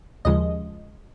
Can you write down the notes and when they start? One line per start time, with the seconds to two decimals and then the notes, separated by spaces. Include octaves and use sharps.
0.25 D#2 C#3 F3 G#3 D#5